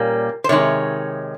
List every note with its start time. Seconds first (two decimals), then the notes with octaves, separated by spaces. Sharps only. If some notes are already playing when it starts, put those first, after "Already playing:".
Already playing: A#2 G3 A#3 C#4
0.44 C5
0.49 C3 D#3 G#3 D#4 C#5